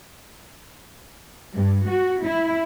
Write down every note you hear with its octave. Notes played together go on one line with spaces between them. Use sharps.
G2
F#4
E4